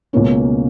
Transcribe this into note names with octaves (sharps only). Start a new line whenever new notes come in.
C#2 B2 A#3 C#4